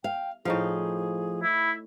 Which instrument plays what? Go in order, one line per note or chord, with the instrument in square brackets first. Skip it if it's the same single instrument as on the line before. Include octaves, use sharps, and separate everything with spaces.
[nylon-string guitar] F5 [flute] G5
[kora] A2 D#4 F5 [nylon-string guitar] F3 [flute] G#4
[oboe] E4 [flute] B5